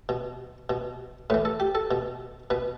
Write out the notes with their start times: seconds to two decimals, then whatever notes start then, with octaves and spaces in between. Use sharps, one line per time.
0.09 B2
0.70 B2
1.30 A2 E3 B4
1.45 A4
1.60 G4
1.75 A4
1.91 B2
2.50 B2 B4